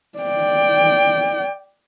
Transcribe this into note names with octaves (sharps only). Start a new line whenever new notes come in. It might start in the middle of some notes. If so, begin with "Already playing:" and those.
D5 G5